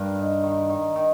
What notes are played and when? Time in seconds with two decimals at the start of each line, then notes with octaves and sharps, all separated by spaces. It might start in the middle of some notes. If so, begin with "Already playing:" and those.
Already playing: G2 A#4
0.18 D#4
0.43 D#3
0.70 D#3
0.96 D#3